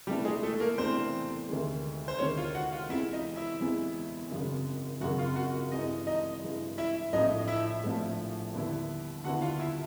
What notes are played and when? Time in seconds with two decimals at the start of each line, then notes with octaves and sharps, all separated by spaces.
0.07 E2 C3 E3 G3 A3 D4 G4
0.25 G#3 G#4
0.43 A3 A4
0.60 A#3 A#4
0.78 E2 C3 E3 A3 C4 D4 C5
1.49 D2 C3 D#3 G#3
2.08 C5
2.19 D2 C3 D#3 G#3 C#4 C#5
2.37 F4 F5
2.55 F#4 F#5
2.72 F4 F5
2.89 E2 C3 E3 G#3 C4 E4 E5
3.13 D#4 D#5
3.36 E4 E5
3.60 E2 C3 E3 G#3 C4
4.31 G#1 F#2 C#3
5.01 G#1 F#2 C#3 F#4 F#5
5.18 F4 F5
5.36 F#4 F#5
5.71 G2 E3 G#3 D#4 D#5
6.07 D#4 D#5
6.42 G2 E3 G#3
6.78 E4 E5
7.12 A#1 A2 F3 A3 C4 D#4 D#5
7.48 E4 E5
7.84 A#1 A2 F3 A3 C4
8.54 D#2 D3 G3 B3 E4
9.24 D#2 D3 G3 B3 E4 F#4 F#5
9.42 F4 F5
9.60 E4 E5